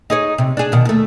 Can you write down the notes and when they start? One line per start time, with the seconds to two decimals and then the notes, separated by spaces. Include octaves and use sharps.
0.10 D#4 G#4 C#5
0.38 C3
0.57 D4 G#4
0.72 B2 D#3
0.85 D#2 A3